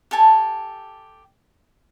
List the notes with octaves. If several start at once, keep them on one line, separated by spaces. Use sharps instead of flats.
G4 A4 G#5 A5